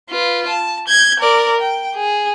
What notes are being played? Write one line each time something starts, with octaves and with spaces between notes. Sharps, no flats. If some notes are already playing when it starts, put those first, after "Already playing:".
F4 B4
A5
G6 G#6
A#4 D5
G5
G#4